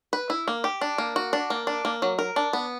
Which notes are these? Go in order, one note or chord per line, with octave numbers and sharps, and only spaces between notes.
B4
E4
A#3
G4
D4
A#3
F#4
D4
A#3
D4
A#3
F#3
A#4
D4
B3